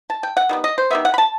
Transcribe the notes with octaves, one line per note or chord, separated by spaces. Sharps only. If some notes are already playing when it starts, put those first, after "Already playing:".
A5
G5
F#5
D#3 G3 B3
D#5
C5
D#3 G3 B3 E5
F#5
B5
A5